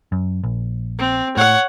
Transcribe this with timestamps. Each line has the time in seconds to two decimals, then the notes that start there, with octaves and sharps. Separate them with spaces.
0.12 F#2
0.43 A#1
0.99 C4
1.37 A2 C#5 F#5